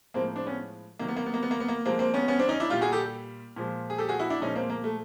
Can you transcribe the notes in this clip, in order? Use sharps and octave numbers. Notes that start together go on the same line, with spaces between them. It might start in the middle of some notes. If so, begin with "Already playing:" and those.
A2 F3 G#3 A#3 C4
C4 D4
B3 C#4
C3 D#3 F#3 A#3
B3
A#3
B3
A#3
B3
A#3
B3
A#3
C3 F3 G#3 A#3 C4
A#3 C4
B3 C#4
B3 C#4
C4 D4
C#4 D#4
D4 E4
A#2 G3 F4 G4
F#4 G#4
G4 A4
A#2 F3 G#3
G#4
G4 A4
F#4 G#4
E4 F#4
D4 E4
A#2 F3 G#3 C#4 D#4
A#3 C4
A#3
A3